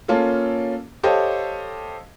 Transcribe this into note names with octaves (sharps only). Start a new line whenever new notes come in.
A#3 C#4 F4 A4
G4 A4 C5 C#5 D#5 F5